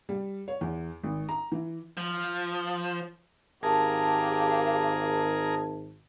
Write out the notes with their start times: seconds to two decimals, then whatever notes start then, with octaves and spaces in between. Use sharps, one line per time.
0.09 G3
0.48 C#5
0.61 E2
1.03 G#1
1.29 A#5
1.52 E3
1.97 F3
3.63 G#1 G4 G#4 A#4 F5 A5